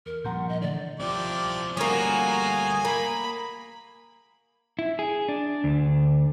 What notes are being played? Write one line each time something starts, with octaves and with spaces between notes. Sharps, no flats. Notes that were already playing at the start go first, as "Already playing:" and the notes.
E2 A#4
A#2 F3 G3 F#5 A#5 C6 G6
D#5
D3 E3 A3 D5
F3 C4 E4 G4 D5
G3 A3 A#3 C#4 F4 F#4 G#5 D#6
A#3 B5
E4
G#4
D4
D2